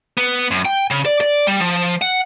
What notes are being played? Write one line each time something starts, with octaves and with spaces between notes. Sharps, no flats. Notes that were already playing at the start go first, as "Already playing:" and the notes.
B3
F#2
G5
C#3
D5
D5
G3
F3
F#5